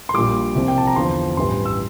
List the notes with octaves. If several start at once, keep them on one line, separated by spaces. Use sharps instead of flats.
C6
A#1 A#2 G3 D6
C2 C3 F3
G5
A5
A#5
E2 D3 F3 C6
A1 G2 E3 G3 C6
E6